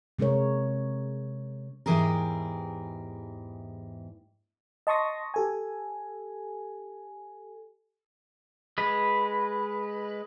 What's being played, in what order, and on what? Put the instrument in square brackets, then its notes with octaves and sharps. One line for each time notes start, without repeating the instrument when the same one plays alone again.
[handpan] C3 G#3 C#4 A#4 C#5
[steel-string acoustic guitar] E2 G#2 E3 G4 G#4 A#4
[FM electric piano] D#5 A5 C6 C#6 D#6 A#6
G4 A4 G#5
[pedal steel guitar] G#3 B4